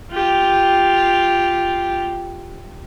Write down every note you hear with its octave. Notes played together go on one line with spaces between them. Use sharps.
F4 G4